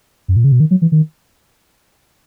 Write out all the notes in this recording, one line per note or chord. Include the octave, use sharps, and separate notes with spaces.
F#2
A#2
C#3
B2
D#3
F#3
E3
D#3